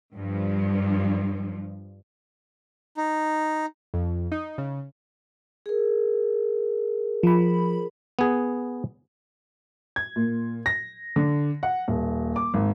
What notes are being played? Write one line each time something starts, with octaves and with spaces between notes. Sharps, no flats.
G2 F3
D#4
F2
D#4
C#3
G#4 A#4
F3 B5
B3 G#4
G#6
A#2
A#6
D3
F#5
D#1
D6
G#1